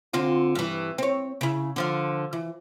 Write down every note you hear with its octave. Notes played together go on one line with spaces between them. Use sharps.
D3 C4 F4
G2 E3
C4 C#5
C#3 E4
D3 F3 F5
E3